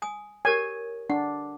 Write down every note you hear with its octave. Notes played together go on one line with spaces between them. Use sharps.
G#5 D#6
G4 A#4 C#5 G#5
D4 F#5